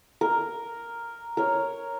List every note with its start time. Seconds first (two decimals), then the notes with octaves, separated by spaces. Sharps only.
0.21 A#4
1.37 A#4 C#5